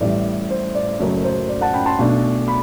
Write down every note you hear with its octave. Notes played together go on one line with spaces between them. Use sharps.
A1 A2 G3 D5
C5
D5
F#1 F#2 F#3 A3
C5
D5
F#5 A5
G5 B5
A5 C6
B1 B2 A3 D4
B5